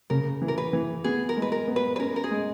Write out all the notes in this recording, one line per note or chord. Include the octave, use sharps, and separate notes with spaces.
C#3 A#4
E3
A#4
B4
E3
B3 G#4
A#4
G#3
B4
A#4
B3
B4
B4
C#4 A#4
A#4
G#4
G#3